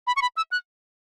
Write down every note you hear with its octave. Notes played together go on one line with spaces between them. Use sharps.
B5
C#6
B5
E6
F#6